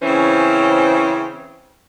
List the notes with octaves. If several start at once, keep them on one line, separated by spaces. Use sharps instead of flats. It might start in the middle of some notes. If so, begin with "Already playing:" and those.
C#3 E3 C4 C#4 C5